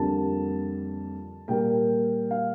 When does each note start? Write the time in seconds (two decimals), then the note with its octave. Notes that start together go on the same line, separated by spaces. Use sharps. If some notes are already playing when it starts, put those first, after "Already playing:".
Already playing: F2 D3 G3 A#3 A5
1.48 A#2 G3 A#3 G5
2.31 F5